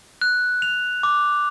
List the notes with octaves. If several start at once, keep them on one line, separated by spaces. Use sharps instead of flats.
F#6
F7
D6